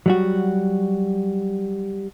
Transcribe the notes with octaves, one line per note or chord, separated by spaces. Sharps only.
F#3 G3 F#4